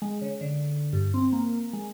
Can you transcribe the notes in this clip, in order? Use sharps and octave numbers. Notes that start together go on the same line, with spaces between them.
G#3
C#3
D3
G2
C4
A#3
G#3